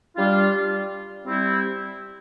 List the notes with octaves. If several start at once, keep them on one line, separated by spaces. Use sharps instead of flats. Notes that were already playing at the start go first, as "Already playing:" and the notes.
G3 D4 F4
G3 C4 E4